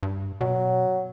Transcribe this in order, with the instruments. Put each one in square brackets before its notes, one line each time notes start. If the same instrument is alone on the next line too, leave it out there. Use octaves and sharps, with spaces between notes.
[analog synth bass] G2
[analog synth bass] B2 [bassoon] F#3